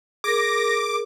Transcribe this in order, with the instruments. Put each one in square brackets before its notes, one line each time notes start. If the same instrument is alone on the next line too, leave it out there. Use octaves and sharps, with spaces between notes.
[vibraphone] G#4 A#4 [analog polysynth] D6 [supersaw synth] A#6